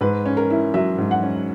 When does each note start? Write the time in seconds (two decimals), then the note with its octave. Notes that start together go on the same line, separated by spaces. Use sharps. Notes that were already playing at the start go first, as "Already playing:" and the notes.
0.01 G#2 B4
0.25 C#4
0.37 A#4
0.50 E4
0.74 F#3 E5
0.98 G#2
1.11 F#5
1.23 C#4